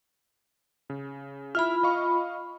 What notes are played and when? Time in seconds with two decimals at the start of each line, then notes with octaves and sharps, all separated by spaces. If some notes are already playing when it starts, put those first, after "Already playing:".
0.90 C#3
1.55 E4 F4 E5 B5 F6
1.83 D#5 F5 C#6